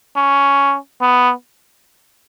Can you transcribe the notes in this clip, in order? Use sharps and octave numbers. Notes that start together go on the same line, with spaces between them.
C#4
B3